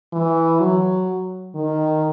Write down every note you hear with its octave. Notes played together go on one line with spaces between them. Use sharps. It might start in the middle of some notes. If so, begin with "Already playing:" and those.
E3
F#3
D#3